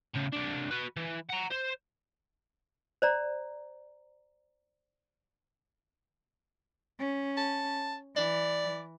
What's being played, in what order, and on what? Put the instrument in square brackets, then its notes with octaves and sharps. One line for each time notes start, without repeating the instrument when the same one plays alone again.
[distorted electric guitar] A2 C#3
C2 D4
F#4 B4
E3
F#5 A#5
C5
[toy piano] C5 D5 A#5
[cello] C#4
[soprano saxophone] A5
[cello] E3 [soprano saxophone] D5